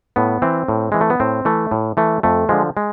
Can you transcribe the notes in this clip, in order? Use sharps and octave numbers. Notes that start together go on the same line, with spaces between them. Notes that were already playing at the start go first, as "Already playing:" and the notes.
A2 B3
E3 C4
A2
E3 G#3
A3
B3
A2 C4
E3 A3
A2
E3 A3
F2 A3
D3 F3 G#3
G#3